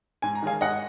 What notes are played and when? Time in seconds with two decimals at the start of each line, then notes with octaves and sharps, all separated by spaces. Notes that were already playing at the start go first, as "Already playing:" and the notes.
0.22 G#2 G#5
0.35 A#5
0.43 D#3 G#3 F5 G#5
0.61 G#2 D#5 F#5